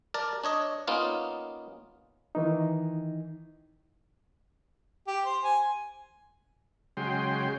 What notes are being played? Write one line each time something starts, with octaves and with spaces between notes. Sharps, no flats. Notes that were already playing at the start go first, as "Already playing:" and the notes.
A#4 D5 A5
D4 C#5 D#5
A#3 B3 C#4 D#4 F4
D#3 E3 D#4
G4
C5
G#5
C#3 F#3 G#3 G5 C6